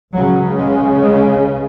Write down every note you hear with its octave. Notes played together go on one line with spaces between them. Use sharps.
C#2 C#3 F#3
G#3
G#3